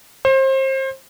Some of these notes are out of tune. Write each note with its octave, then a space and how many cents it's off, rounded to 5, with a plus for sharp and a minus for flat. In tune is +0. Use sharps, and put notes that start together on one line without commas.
C5 +30